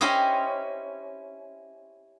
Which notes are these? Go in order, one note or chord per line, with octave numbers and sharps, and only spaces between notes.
C#4 E4 G4 C5 D#5